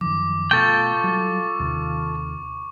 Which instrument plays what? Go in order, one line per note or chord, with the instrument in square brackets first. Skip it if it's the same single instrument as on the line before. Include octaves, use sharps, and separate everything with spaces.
[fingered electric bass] F#2 D#3 F3 [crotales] D6
[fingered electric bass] B2 A3 [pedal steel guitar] F4 A4 G5 [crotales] C#6
[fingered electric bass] F#3 G3
D#2 C3 D#3